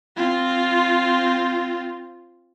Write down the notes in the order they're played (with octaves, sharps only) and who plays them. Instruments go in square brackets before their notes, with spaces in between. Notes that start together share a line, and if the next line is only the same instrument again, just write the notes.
[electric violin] C4 F4